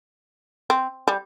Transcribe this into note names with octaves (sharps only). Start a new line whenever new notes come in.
C4
G3